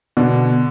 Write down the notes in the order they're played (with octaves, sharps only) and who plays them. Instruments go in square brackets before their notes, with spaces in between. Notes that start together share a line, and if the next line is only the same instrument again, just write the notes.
[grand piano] B2 [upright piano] D3